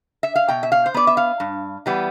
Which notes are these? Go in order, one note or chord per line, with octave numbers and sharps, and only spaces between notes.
E5
F5
B2 G5
E5
F5
C5
B3 D5
E5
F5
G2
E3 G3 B3